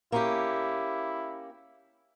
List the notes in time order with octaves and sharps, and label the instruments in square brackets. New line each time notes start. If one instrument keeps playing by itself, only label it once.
[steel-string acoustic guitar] A#3 C#4 G4 [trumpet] E4